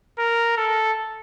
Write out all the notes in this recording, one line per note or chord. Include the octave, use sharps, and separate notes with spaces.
A#4
A4